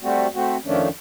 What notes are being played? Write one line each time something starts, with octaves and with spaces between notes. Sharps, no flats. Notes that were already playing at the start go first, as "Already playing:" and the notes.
G3 A3 C4 F#4
A3 C4 F#4
F2 D#3 F3 A3 C#4 D4